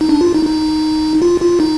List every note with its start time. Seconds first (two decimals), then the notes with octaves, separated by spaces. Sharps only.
0.01 D#4
0.09 D4
0.21 F4
0.35 D#4
0.46 D#4
1.22 F4
1.41 F4
1.60 D#4